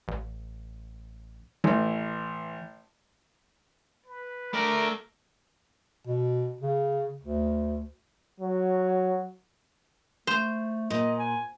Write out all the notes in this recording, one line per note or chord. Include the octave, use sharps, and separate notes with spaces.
A1
A1 E3
B4
A3 A#4 D5
B2
C#3
D2
F#3
A3 C5
A#2 D#5
G#5